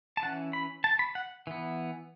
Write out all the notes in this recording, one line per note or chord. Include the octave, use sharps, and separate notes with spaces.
A5
E3 C#4 F#5
B5
A5
B5
F#5
E3 B3